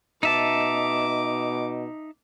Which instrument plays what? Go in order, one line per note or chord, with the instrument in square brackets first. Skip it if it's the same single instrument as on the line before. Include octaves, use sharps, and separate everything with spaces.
[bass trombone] B2 [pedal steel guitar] D#4 E5 A5 [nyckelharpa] D6